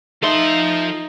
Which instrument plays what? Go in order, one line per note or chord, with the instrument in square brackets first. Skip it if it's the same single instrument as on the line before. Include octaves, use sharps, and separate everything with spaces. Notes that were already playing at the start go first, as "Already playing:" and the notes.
[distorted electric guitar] F3 C6 [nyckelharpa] D#4 [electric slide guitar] A4 E5